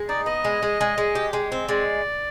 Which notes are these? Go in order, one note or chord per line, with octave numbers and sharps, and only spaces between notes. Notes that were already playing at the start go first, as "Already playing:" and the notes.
Already playing: G#3
D#4 D5
B3 D#5
G#3
G#3
G#3
G#3
G4
G#3
C4
G#3 D5